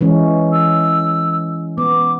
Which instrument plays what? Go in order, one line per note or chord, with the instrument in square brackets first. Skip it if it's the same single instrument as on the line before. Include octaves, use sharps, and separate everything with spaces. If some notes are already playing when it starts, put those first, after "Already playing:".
[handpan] E3 G#3 C#4
[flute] E6
[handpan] B3 [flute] D6